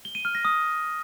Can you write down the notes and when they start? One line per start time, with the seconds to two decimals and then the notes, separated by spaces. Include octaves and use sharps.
0.05 G7
0.15 D#7
0.25 F6
0.35 A#6
0.45 D#6